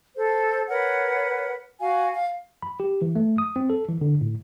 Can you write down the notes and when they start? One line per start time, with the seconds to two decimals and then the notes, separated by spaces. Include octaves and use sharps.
0.17 A4 C5
0.69 A#4 B4 C#5 F#5
1.81 F#4 F5 G#5
2.14 F5
2.62 B5
2.80 G4
3.02 E3
3.15 A3
3.38 D#6
3.56 C4
3.70 A4
3.88 E3
4.01 D3
4.21 A2